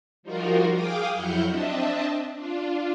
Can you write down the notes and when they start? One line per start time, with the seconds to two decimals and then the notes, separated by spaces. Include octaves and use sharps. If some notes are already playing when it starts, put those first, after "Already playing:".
0.23 F3 G3 D#4 F4 F#4 A#4
0.72 G#4 F5 G5 D6 D#6 F6
1.12 F2 F#3 E4 F#5 F6 G6
1.48 C4 D4 D#5 E5 A5
2.35 D4 F4